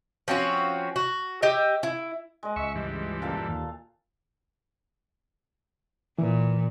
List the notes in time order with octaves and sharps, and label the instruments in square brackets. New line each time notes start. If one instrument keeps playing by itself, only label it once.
[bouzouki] F3 C4 C#4 F#4
F#4
G4 D#5 E5
E4
[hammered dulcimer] G#3 D#5
[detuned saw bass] C#2 [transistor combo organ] E5 C#6
[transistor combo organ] G2 E3
[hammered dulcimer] A#2 A4 F5
[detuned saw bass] D#2
[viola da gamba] A#2 [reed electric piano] E3